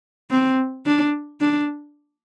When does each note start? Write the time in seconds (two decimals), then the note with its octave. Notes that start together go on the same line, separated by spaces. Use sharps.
0.31 C4
0.86 D4
1.41 D4